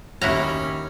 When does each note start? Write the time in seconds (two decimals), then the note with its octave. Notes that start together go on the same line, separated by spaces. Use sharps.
0.22 D#2 C#4 E4 F#4 A#5